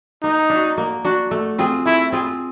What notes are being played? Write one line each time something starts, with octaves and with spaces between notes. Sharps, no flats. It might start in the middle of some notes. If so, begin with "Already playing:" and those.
A#3 D#4
D4
F#4
A#3
D4 F#4
A3
C4 F4 G#4
A3 E4
C4 F4 G#4